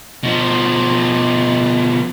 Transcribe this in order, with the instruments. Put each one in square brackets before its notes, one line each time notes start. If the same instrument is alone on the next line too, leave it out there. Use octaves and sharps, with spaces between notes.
[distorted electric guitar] B2 F3